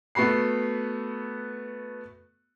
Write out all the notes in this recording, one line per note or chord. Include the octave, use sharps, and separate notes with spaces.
A3 B3 F#4 B5 C7